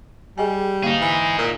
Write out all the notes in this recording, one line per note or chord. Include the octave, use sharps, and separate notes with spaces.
G3 G#4 D#5 G#5
D3 A#3 D#4 G#4 F5
E3
A#2